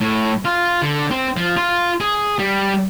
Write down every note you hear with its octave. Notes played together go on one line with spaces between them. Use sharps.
A2
F4
D3
C4
F3
F4
G#4
G3